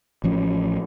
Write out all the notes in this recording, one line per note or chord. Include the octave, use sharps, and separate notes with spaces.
A1 F3 C#4